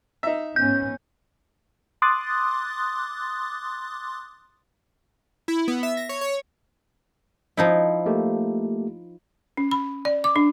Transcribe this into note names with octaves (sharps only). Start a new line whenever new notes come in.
D#4 E5
G#2 B3 C#4 G6
C6 D6 D#6 F#6 A6
E4
B3
E5
A#6
C#5
C#5
F3 D#4 E4
A3 A#3 G4
C#4
B5
D5
D6
D4